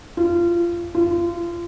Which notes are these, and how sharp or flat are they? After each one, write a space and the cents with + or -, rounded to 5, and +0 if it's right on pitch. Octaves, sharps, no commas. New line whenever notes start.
F4 -25
F4 -30